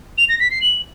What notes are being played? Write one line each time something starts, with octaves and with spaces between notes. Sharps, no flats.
F7
A#6
B6
C7
F#7